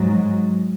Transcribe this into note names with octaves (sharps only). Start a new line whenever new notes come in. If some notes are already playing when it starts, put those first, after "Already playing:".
Already playing: G#2 F#3